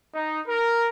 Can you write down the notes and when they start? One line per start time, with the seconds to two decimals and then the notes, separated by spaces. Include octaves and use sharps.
0.14 D#4
0.46 A#4